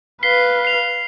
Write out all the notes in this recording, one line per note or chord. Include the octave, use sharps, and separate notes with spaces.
B4 F5 B6 C7 G7
C7 F7